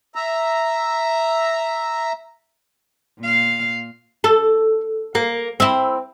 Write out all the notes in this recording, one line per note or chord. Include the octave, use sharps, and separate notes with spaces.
E5 A#5
A#2 F5
A4
A#3
C4 E4